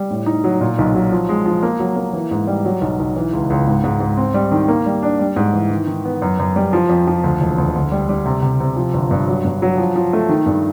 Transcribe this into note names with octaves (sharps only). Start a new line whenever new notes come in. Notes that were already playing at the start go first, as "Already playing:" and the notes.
Already playing: G3
A2
D#4
F#3
A#2
B1
F#3
F3
G#3
F3
A#3
F#3
A#3
E3
G#2
G3
F#3
B1
B1
E3
C#2
C#2
G#2
G#2
G#2
C4
G3
D#3
A#3
G3
D4
G3
G#2
E3
D#3
D#3
B3
F#2
F#2
G3
F3
F2
F3
D2
E1
D2
D2
G3
G3
C3
C3
C3
F3
G1
G2
F#3
G2
F#3
F3
F3
A3
D#3
G2